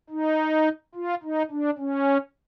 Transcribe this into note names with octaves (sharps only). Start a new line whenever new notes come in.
D#4
F4
D#4
D4
C#4